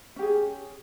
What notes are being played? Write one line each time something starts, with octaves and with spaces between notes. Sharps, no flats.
C#4 G4 G#4